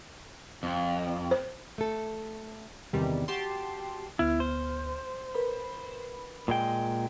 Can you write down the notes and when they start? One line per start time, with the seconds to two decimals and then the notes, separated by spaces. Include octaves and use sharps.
0.63 F2
1.31 C5
1.78 A3 A4
2.93 G1 E2 C3 D#3 G3
3.28 F#4 G4 A5 C6
4.19 D2 B3 E4 F6
4.40 C5
5.35 A#4 B4 B5
6.48 A#2 G#3 G5